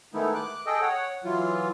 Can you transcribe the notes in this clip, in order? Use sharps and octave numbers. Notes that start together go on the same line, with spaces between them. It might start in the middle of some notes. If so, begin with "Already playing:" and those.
D#3 G#3 A3 B3 D#4 E4
D6 F#6
G#4 A4 D#5 G5
C#5 F#5
E3 F#3 F4